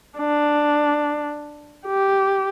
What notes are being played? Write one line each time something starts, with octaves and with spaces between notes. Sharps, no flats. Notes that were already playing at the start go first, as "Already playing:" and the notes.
D4
G4